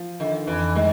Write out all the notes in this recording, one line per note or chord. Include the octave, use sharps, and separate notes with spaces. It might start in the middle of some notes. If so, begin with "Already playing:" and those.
Already playing: F3
D3 D#3
F2 E3
D#3 G#3